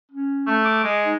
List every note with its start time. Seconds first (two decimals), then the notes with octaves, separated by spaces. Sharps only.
0.12 C#4
0.47 A3
0.64 D6
0.84 G#3
1.05 D#4